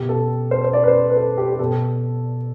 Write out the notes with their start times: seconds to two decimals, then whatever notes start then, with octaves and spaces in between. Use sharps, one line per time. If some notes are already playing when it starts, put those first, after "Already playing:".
Already playing: B2 G4
0.09 A4
0.51 C5
0.64 C5
0.73 D5
0.83 B4
0.88 C5
1.10 B4
1.17 A4
1.38 G4
1.53 G4
1.59 B2 A4